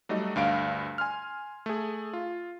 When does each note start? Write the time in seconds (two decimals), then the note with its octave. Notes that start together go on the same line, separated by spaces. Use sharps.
0.09 F#3 G3 A3 D#4 D#5
0.36 D2 G2 F5 D7
0.98 G#5 C6 F6
1.66 A3 G#4
2.13 F4